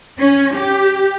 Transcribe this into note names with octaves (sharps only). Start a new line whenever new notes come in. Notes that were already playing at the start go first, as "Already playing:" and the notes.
C#4
G4